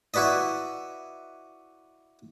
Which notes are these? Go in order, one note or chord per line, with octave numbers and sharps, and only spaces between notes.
E4 F#4 B4 D5 D#5